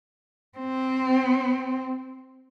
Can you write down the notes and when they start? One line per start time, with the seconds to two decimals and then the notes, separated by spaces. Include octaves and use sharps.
0.58 C4